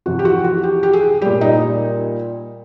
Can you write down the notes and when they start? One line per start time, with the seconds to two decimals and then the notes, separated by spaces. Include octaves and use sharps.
0.06 F2 C3 E3 F#4
0.19 G4
0.25 F#4
0.44 F#4
0.63 G4
0.83 G4
0.93 G#4
1.22 A#2 G3 G4
1.41 D#4